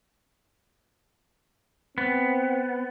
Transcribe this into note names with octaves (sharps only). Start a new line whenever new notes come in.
B3 C4